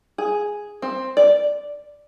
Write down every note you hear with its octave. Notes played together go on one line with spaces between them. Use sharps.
G#4
C4
D5